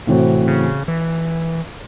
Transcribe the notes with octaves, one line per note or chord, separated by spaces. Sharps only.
A2 C3 E3 C4 F#4 C5
C#3
E3